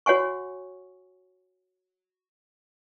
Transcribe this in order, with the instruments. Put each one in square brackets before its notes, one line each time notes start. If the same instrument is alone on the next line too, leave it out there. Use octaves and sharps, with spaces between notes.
[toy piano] F#4 C#5 F#5 G#5 C#6